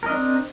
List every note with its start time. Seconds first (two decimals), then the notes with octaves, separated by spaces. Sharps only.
0.03 A#4
0.06 D#5
0.10 D4
0.13 C4